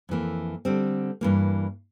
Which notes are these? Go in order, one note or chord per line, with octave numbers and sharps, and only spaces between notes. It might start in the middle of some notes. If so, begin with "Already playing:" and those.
F2 E3 A#3
D3 G3 C4
G2 E3 A#3